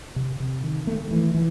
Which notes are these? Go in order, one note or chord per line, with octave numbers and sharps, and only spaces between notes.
C3
C3
D#3
A3
E3
E3